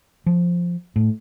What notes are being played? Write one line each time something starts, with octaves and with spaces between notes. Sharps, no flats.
F3
A2